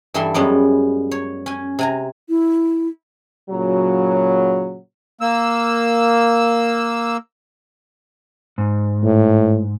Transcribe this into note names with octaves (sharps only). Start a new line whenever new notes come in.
G2 E3 G3 A4 E5 C6
F#2 G3 G#3 B3 C#4
C#5
C#4 G#5
C3 G#5 A#5
E4
A#2 C#3 F#3
A#3 E6
G#2
A2